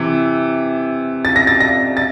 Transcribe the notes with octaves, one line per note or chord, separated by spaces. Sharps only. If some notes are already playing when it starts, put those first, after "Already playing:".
Already playing: C3 E3
A6
A#6
A6
A#6
A6